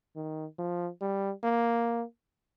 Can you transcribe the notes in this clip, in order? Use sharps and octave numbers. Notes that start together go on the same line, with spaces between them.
D#3
F3
G3
A#3